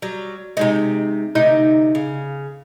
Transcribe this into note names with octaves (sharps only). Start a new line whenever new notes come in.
F#3 G3
C3 G#3 D#4
D2 C3 D#4
C#3